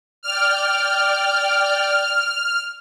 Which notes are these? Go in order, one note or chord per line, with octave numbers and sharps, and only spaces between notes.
D5 G5 F6